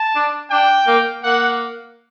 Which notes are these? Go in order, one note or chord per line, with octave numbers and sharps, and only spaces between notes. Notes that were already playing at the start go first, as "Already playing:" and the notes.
Already playing: A5
D4
D4 G5
A#3
A#3 F#5